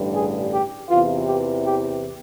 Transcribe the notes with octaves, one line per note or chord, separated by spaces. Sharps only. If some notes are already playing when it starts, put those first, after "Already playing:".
Already playing: A1 G2 D3 G3
G#4
G4
E2 C3 E3 F4
G4
G4